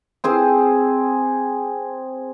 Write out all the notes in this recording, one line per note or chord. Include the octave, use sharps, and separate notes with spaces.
C4 G#4 C5